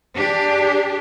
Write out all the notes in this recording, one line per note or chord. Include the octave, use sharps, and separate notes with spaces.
D4 G4 G#4